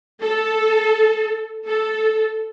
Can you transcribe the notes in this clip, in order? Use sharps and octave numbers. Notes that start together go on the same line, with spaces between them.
A4
A4